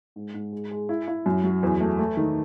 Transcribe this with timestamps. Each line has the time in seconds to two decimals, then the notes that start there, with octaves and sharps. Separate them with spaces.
0.16 G#2
0.34 G#2
0.52 G#3
0.71 G#3
0.89 E4
1.08 E4
1.26 F#2
1.44 F#3
1.63 E2
1.81 A3
1.99 A3
2.17 D#3